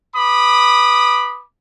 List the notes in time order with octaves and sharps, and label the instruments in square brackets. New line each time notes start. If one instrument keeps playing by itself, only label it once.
[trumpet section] B4 B5 D6 D#6